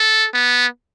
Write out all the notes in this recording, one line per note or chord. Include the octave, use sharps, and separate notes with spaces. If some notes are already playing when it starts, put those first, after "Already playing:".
Already playing: A4
B3